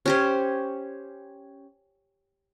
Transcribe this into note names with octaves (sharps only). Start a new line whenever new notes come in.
C#4 G4 C5